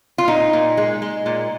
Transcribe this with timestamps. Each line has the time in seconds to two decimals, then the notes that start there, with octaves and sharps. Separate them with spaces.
0.18 F4
0.28 A#2 D#4
0.53 A#2
0.77 G#3
1.02 G#3
1.26 A#2